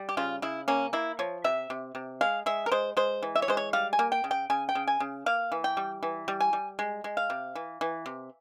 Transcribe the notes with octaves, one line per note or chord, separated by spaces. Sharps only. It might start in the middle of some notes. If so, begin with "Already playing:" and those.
Already playing: G3
G4
C#3 F4
C#3 E4
A#3 C#4
A#3 E4
F3 C#5
C3 E5
C3
C3
G#3 F5
G#3 E5
A#4
G#3 C5
G#3 C5
E3
E5
C#5
G#3 C5
C#5
G3 F5
G#5
A#3
G5
C#3
G5
C#3 G#5
G5
C#3
G#5
C#3
A#3 F5
E3
G5
G3
E3
G3
G#5
G3
G#3
G#3
F5
C3
E3
E3
C3